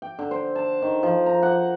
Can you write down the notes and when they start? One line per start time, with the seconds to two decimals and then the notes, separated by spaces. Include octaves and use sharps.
0.02 G5
0.19 D3
0.31 C5
0.55 A5
0.82 D#3
1.03 F3
1.26 A#5
1.43 F#5